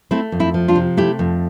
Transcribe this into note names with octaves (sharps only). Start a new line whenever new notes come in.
A3 C4 E4
F2
C4 E4
F3
D4 F4
C3
A3 E4 G4
F2